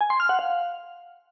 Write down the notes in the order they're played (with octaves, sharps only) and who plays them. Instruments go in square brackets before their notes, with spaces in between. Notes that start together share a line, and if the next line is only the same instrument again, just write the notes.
[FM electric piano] G#5
C6
F6
F#5
F5